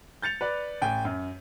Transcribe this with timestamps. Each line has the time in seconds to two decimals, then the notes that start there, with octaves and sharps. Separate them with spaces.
0.22 G6 A6 C#7 F7
0.41 B4 D5
0.82 A1 G5 G#5
1.05 F#2